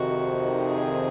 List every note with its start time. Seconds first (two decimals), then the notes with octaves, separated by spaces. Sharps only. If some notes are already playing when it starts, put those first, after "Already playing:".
Already playing: F2 C3 D#3 F#4
0.64 G#4